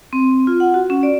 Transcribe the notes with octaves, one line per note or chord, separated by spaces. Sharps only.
C4
F4
F#5
F#4
C#4
D5